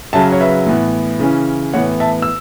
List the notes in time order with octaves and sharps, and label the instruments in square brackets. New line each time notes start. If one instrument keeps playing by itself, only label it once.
[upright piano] C#3 F#3 C#4 E5 A5
C#5
B4 E5
A2 E3 B3
C#3 E3 C#4
A2 E3 B3 C#5 F#5
E5 A5
E6